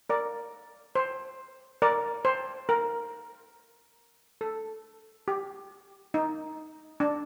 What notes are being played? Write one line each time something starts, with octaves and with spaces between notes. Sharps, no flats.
A#4 D5
C5
A#4 D5
C5
A#4
A4
G4
D#4
D4